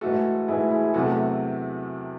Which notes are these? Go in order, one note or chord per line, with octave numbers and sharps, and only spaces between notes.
G#2 E3 A3 F#4 A4
G#2 E3 A3 E4 G#4
E4 G#4
G#4
E2 C3 F#3 A3 F#4 A4